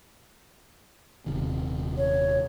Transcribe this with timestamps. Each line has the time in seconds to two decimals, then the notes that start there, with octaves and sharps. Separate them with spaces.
1.26 D#1 C3 D#3
1.97 C#5